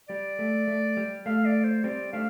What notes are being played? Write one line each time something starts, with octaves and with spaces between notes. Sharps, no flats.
G3 D5
A3
A3
G3
A3 F5
D5
C5
G3 C4 D5
A3 D4 F5